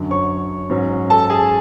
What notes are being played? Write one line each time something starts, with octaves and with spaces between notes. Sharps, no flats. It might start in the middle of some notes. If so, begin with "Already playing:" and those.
Already playing: F#2 D3 F#3
C#5 C#6
G#2 F#3 C#4
A4 A5
G#4 G#5